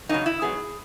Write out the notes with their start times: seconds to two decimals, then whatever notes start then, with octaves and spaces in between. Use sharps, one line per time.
0.09 C#3 F#3 A#3 C#4 D#4
0.26 E4
0.42 G#2 F#3 B3 G#4